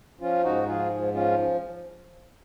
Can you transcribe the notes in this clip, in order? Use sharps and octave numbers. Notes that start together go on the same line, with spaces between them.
F3 C#4 F4
G#2 D#4 F#4
F3 F4 G#4
G#2
F3 C#4 F4